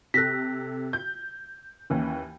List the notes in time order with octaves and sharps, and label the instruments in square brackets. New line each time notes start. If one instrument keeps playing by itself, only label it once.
[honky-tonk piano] C3 A4 [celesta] F#6 A#6 B6
[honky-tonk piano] G6
D#2 E3 C#4